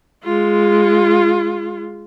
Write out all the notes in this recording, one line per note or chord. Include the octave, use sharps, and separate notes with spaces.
G#3 F4